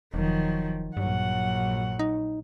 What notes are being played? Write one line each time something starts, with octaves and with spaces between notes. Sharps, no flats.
E1 D#3 F3 F#3
A#1 G2 F#3 F#5
D#4